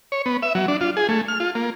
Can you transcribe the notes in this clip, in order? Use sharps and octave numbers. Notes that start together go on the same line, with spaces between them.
C#5
B3
E5
F#3
D4
F4
G#4
A3
F6
F4
A#3